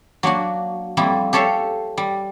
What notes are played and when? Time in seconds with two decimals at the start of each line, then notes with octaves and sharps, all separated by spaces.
0.23 F#3 A#3 D4 F#4
0.97 F2 G3 A#3 E4
1.33 G4 A4 C#5 E5 F5
1.97 G3